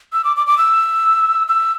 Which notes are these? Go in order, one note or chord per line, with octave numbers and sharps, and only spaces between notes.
E6
D6
D6
D6
E6
E6